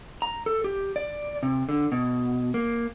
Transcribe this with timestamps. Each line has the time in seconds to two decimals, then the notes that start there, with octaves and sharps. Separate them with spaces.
0.22 A#5
0.46 A4
0.64 G4
0.96 D5
1.43 C3
1.69 D3
1.92 B2
2.54 A#3